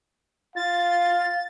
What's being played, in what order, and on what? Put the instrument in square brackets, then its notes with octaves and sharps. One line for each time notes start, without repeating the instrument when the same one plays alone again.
[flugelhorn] F4 [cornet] F5 [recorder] A6